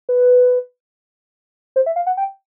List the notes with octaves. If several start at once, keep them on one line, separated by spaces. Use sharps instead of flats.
B4
C5
E5
F5
F#5
G5